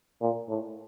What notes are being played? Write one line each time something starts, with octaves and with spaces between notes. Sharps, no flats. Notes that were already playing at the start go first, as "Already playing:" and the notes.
A#2
A2